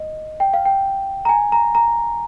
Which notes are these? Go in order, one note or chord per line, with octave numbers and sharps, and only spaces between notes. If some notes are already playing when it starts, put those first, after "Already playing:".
Already playing: D#5
G5
F5
G5
A#5
G#5
A#5
A#5